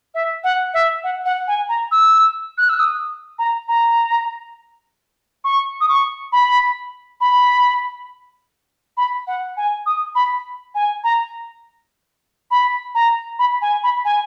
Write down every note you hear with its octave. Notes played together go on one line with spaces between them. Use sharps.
E5
F#5
E5
F#5
F#5
G#5
A#5
E6
F#6
E6
D#6
A#5
A#5
C#6
D#6
C#6
B5
B5
B5
F#5
G#5
D#6
B5
G#5
A#5
B5
A#5
B5
G#5
B5
G#5